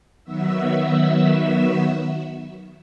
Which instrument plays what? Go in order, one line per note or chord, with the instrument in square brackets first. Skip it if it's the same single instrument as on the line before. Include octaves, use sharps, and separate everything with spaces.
[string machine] D#3 F#3 B3 F#4 E5 E6